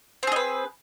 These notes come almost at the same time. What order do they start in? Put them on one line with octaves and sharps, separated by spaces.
C4 G#4 D#5 B4